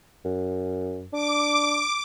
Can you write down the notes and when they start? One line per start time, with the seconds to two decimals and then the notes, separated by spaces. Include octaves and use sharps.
0.25 F#2
1.13 D4 D6